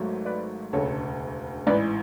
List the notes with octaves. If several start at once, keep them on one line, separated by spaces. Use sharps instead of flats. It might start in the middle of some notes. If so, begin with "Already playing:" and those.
Already playing: G#1 G#2 F#3 A3
B4 D5
E1 D2 C#3 A4 C#5
A1 G#2 E3 B4 D5